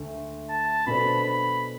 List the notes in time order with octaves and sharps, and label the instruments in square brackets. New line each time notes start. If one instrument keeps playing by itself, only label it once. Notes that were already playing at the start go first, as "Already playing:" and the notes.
Already playing: [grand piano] D2 D3 A3
[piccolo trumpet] A5
[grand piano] B2 B3 D4 A4 C5 [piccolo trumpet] B5
[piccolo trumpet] B5